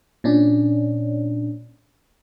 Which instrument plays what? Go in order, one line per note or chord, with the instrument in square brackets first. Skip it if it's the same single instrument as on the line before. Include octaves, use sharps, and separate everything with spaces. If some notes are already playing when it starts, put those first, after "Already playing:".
[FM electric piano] A#2 C#4 D4